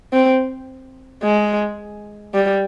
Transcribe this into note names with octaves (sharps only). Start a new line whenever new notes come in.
C4
G#3
G3